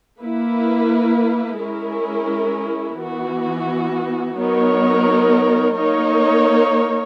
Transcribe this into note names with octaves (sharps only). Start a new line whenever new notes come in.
A#3 E4 B4
G#3 C#4 E4 A#4
E3 B3 F#4
F#3 B3 D#4 A#4 C#5
A#3 D#4 A#4 C#5